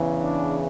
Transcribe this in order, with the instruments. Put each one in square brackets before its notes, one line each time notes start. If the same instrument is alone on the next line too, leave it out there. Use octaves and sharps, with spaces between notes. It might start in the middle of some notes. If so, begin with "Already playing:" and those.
Already playing: [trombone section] E2 C#3 E3
D4